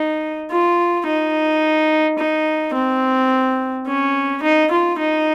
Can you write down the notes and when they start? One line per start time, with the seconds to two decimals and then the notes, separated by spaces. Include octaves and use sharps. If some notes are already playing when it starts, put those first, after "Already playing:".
Already playing: D#4
0.51 F4
1.06 D#4
2.19 D#4
2.74 C4
3.87 C#4
4.42 D#4
4.71 F4
4.99 D#4